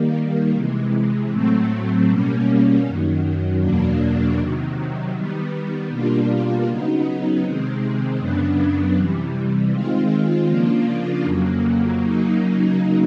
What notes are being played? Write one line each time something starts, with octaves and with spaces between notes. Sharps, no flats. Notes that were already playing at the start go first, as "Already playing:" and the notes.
Already playing: D#3 G3 A#3
C3 E3 G#3
A2 F#3 A3 C4
B2 G3 A#3 C#4
F#2 D#3 F#3
E2 B2 F#3 A#3 D4
C3 D#3 F#3
D#3 G3 B3
B2 G3 A#3 D4 F4
C#3 F#3 B3 D#4
C3 D#3 G#3 C4
F#2 C#3 F#3 B3 D4
C3 E3 G3
D#3 G#3 C4 F4
C#3 F3 A#3 D4 F4
F2 C#3 F#3 A#3
C#3 F#3 A#3 D#4